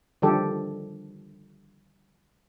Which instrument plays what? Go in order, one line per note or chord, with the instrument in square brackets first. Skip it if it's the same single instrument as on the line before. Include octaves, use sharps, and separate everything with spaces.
[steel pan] D3 D#3 F3 G3 G4 A4